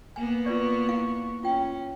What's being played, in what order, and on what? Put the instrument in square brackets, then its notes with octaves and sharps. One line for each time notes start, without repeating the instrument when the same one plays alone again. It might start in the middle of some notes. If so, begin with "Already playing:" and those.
[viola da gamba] A#3 B3 [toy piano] G#5
[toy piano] F4 B4 D5 [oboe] C#6
[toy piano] E4 F5
[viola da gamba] C#4 [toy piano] F4 G5